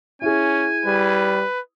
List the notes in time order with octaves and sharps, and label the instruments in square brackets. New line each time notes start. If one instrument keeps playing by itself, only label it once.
[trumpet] C#4 [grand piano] E4 G#4 [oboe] G#5
[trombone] G3 [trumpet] B4